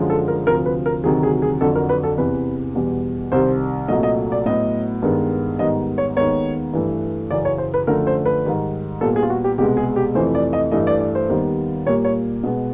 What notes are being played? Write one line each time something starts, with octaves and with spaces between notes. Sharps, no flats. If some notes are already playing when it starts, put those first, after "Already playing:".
Already playing: F#2 D3 F3 G#3
A4
A#4
D2 C3 F3 A#4
B4
A#4
D2 C3 D#3 F#3 G#4
G#4
G#4
F2 D3 F#3 A4
A#4
B4
A4
E2 C3 E3 B4
E2 B2 G3
C2 C3 D#3 G3 C5
C2 A#2 F#3 A3 D#5
D#5
D5
A2 F#3 B3 D#5
G2 D#3 G#3 B3
G#2 D#3 G3 B3 D#5
C#5
D#2 D#3 G#3 B3 C#5
G2 E3 A3
F#2 C#3 E3 D5
C#5
C5
B4
F#2 D3 F3 A3 A#4
C5
B4
G#2 D#3 G3
A#2 G3 B3 A4
G#4
F4
F#4
G4
C2 B2 G#3 B3 G4
G#4
G4
F2 C3 E3 A3 C5
D5
D#5
G2 E3 A3 D#5
D5
D5
C5
D#2 D#3 G3 B3
A#2 G3 A#3 C#5
C#5
B2 G#3 B3